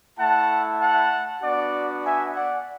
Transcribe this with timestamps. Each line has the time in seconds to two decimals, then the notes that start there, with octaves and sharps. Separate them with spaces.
0.17 A3 E4 F#5 A5
0.78 F#5 A5
1.42 B3 D4 F#4 D5 F#5
2.04 E5 G#5
2.35 D5 F#5